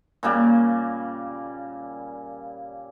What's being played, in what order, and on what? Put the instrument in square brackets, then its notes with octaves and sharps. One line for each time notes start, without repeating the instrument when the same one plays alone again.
[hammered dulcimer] A#2 C#3 G3 A#3